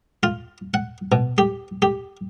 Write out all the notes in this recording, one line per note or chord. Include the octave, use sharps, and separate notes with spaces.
F4
F#5
B2
G4
G4